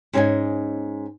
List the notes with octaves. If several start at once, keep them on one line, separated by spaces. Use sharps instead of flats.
G#2 C#4 F#4 G4 D#5 G#5